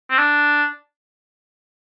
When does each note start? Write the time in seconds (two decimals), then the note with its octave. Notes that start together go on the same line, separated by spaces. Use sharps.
0.10 C4
0.19 D4